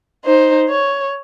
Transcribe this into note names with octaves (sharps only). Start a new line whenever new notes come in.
D#4 C5
C#5